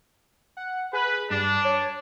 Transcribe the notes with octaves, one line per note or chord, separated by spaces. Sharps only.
F#5
G#4 B4
G2 D4
C#5